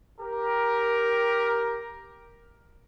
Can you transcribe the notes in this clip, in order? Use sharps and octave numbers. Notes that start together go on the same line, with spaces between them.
G4 A#4